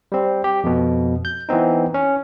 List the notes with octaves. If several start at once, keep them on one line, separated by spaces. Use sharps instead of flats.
G3 C4
G4
F2 B2
G6
E3 B3 C4 D#4
C#4